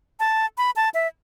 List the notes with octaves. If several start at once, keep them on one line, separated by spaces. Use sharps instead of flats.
A5
B5
A5
E5